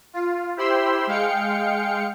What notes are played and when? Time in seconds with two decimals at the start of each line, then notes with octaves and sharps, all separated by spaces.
0.14 F4
0.57 E4 G4 C5 B5 C6 E6
1.07 G#3 F5 G5 C#7